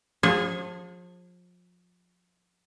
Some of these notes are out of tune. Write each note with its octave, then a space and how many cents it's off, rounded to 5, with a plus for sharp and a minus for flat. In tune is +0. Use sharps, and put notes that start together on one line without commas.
F3 +35 G#4 -20